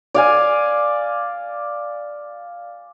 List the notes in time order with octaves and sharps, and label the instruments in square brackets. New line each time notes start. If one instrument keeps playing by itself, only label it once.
[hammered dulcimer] D5 F5 G#5